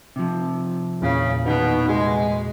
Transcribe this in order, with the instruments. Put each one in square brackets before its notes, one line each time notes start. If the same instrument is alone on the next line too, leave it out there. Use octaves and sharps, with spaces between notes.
[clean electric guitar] C3 F3
[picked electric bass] E2 A#2 [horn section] C#3
[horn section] B2 [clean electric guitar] D#3
[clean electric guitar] C2 [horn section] G#3